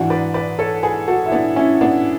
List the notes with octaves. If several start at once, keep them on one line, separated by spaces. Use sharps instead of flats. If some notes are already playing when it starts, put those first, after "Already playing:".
Already playing: G#2 E3 D4 F#4
B4 D5
B4 D5
A4 C#5
G#4 B4
F#4 A4
E4
B3 D4
C#4 E4
B3 D4